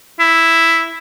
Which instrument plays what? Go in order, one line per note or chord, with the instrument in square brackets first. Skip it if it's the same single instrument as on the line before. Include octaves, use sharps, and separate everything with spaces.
[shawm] E4